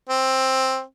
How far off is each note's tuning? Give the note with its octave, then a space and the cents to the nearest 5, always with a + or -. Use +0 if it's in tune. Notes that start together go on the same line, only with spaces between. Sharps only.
C4 +10